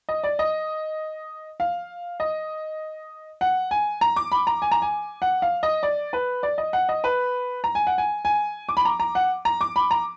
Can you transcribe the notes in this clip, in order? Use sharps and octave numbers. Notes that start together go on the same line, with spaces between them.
D#5
D5
D#5
F5
D#5
F#5
G#5
A#5
D6
B5
A#5
G#5
A#5
G#5
F#5
F5
D#5
D5
B4
D5
D#5
F#5
D#5
B4
A#5
G#5
F#5
G#5
G#5
D6
B5
A#5
A#5
F#5
A#5
D6
B5
A#5